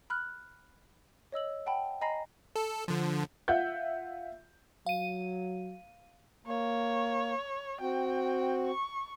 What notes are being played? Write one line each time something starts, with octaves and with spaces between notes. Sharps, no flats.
B5 F6 F#6
C#5 D#5 E6 F#7
F#5 G5 A5 B5
D#5 G#5 A#5 B5 A#6 C7
A4
D3 F3
F4 E5 F#5 G6
F#3 F5 D#7
A#3 C#5
C4 F#4 G5
C#6